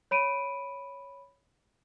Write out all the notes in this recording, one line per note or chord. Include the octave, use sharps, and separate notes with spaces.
C#5 B5 D7 D#7